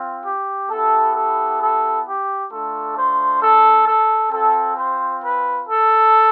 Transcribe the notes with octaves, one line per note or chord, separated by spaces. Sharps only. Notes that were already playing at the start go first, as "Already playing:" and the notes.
Already playing: C4 F4
G4
B3 E4 G4 A4
A4
A4
G4
A3 D4 F4 A4
C5
A4
A4
C4 F4 A4
C5
B4
A4